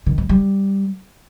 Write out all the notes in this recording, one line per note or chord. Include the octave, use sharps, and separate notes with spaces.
D#3
G#3
G3